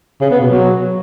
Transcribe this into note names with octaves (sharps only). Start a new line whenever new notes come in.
C#3
B3
B2
F#3